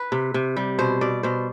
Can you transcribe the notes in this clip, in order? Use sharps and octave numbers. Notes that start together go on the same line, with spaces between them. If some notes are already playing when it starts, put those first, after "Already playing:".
Already playing: B4
C3
C3
G3
B2 C5
B2 D5
B2 C5